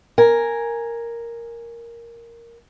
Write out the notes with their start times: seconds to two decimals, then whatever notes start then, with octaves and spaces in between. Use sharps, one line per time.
0.18 A#4 G#5